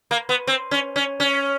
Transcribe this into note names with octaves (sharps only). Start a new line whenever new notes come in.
A#3
B3
C4
C#4
C#4
C#4